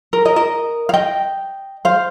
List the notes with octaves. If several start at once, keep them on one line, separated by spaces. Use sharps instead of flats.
A#4
A#4 D#5
A#4 D#5
F5
D#5 G5
C5 F5